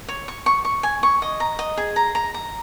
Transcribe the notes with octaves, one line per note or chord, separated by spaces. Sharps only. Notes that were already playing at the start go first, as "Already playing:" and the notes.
C#5
C#6
C#6
C#6
G#5
C#6
D#5
A#5
D#5
G#4
A#5
A#5
A#5